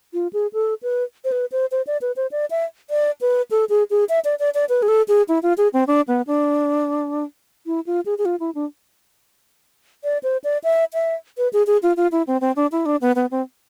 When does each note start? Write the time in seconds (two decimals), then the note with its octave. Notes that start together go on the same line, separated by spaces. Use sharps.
0.14 F4
0.33 G#4
0.53 A4
0.83 B4
1.25 C5
1.32 B4
1.52 C5
1.72 C5
1.87 D5
2.02 B4
2.16 C5
2.32 D5
2.51 E5
2.90 D5
3.21 B4
3.51 A4
3.69 G#4
3.90 G#4
4.09 E5
4.25 D5
4.39 D5
4.55 D5
4.69 B4
4.82 G#4
4.88 A4
5.08 G#4
5.28 E4
5.43 F4
5.58 G#4
5.73 C4
5.87 D4
6.08 B3
6.27 D4
7.66 E4
7.87 F4
8.06 G#4
8.18 G#4
8.25 F4
8.40 E4
8.55 D4
10.04 D5
10.23 C5
10.44 D5
10.64 E5
10.94 E5
11.38 B4
11.53 G#4
11.67 G#4
11.83 F4
11.97 F4
12.12 E4
12.27 C4
12.41 C4
12.56 D4
12.72 E4
12.86 D4
13.02 B3
13.16 B3
13.31 C4